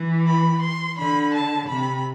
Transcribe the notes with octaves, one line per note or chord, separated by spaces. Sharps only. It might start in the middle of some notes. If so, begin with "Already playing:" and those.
Already playing: E3
B5
C6
D3 B5
A5
C3 B5